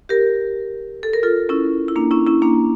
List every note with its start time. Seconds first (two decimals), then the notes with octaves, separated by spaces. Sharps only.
0.09 G4 A#4
1.03 A4
1.13 A#4
1.23 F4 A4
1.49 C#4 E4
1.88 E4
1.96 A#3 D4
2.11 C#4 E4
2.27 C#4 E4
2.42 A#3 D4